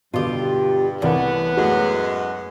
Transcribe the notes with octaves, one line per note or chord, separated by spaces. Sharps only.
G2 B2 D3 F4 G4
C2 A2 E3 B3 D5 F#5
F#2 G#3 A3 F#4